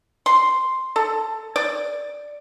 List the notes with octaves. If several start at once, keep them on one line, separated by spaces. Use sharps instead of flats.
C6
A4
D5